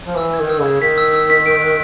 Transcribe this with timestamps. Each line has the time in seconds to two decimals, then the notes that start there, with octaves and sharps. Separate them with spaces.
0.06 F3
0.17 E3 E6
0.34 G#6
0.40 D#3
0.50 E6
0.61 C#3
0.66 G#6
0.81 D#3 B6
0.98 E6
1.14 E6
1.30 B6
1.46 D7
1.62 F#6